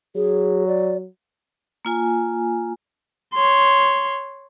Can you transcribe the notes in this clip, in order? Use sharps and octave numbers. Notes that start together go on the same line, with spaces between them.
F#3 G#4
D5
A#3 F4 G#5
C#5 C6